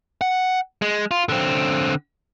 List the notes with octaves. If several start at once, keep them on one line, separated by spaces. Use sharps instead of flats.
F#5
G#3
F4
D3 C4